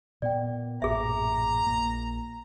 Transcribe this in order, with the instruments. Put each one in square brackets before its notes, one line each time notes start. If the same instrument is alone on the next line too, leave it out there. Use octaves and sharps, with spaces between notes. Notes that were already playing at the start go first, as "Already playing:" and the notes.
[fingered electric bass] A#2 B3 [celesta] D5 G5
[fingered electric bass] A1 F#2 A#2 [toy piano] G#4 E5 [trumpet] A#5
[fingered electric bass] A#1 A#3